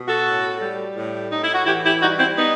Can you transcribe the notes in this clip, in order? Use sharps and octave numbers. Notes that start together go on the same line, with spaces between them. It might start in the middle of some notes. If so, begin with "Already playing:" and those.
Already playing: B2
F#4 A4
A2
G3
A2
A2 D#4
E4
F#4
E3 E4 G4
E4 G4
G3 D#4 F#4
C4 E4
B3 D#4